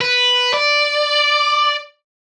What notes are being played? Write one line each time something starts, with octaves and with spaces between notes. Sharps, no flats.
B4
D5